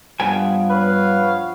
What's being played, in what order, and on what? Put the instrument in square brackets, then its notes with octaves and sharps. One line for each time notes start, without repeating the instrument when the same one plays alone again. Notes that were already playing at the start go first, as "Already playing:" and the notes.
[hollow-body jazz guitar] G2 G5 G#5 [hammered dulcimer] F3 B3
[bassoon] B4 [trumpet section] C#5 F5